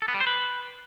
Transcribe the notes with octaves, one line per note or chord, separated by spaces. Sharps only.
A4
B3
G3
C5
B4